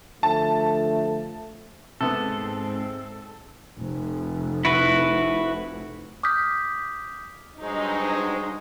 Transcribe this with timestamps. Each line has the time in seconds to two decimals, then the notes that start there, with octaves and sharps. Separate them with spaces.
0.23 D3 F3 A3 A5
2.01 G#2 C3 G#3 B3 C4 A4
3.78 F1
4.65 E4 F#4 B4
6.23 D6 D#6 F6 G6 B6
7.62 G2 F#3 G#3 D#4 C5